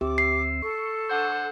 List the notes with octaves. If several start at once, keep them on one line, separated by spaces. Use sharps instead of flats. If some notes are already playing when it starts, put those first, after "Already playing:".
D2 C4 G4 E5 D6
C7
A4 C#6
D3 C5 F#5